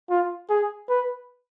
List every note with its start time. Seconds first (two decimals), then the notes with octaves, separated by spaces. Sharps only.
0.10 F4
0.50 G#4
0.89 B4